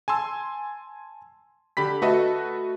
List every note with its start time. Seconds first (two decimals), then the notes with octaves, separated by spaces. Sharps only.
0.08 G#5 A5 C6 E6
1.77 D3 G4 B5 B6
2.02 A3 F#4 A4 B4 D#5 E5